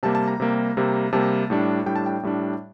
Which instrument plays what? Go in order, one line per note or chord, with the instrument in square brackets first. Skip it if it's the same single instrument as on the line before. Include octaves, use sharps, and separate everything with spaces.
[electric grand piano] C3 G3 A#3 A5
A5
A#5
C3 G3 A#3
C3 G3 A#3
C3 G3 A#3 A5
A2 G3 D4
A2 G3 D4 G5
A5
G5
A2 G3 D4